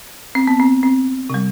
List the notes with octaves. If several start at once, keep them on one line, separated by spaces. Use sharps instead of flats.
C4
B3
C4
C4
C3 G3